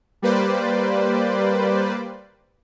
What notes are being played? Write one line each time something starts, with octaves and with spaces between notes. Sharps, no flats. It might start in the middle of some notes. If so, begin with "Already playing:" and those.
G3 A#3 B4 C5 D5